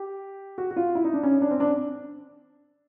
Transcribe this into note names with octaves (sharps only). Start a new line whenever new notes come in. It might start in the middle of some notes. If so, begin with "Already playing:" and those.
Already playing: G4
F#4
F#4
F4
E4
D#4
D4
C#4
D4
C4
D4